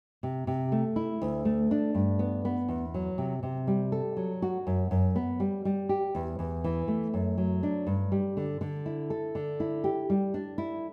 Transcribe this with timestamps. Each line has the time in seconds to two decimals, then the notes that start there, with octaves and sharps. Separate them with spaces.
0.23 C3
0.47 C3
0.72 A3
0.96 E4
1.22 D2
1.45 A3
1.71 D4
1.95 G2
2.19 B3
2.45 B3
2.69 E2
2.94 F#3
3.18 C3
3.43 C3
3.67 G3
3.92 A4
4.17 F#3
4.42 F#4
4.67 F#2
4.91 F#2
5.16 B3
5.40 G3
5.65 G3
5.89 G4
6.15 E2
6.39 E2
6.64 E3
6.88 A3
7.14 F#2
7.38 F#3
7.63 D4
7.87 G2
8.12 G3
8.37 D3
8.61 D3
8.86 E4
9.10 A4
9.35 D3
9.60 E4
9.84 G4
10.10 G3
10.34 D4
10.58 E4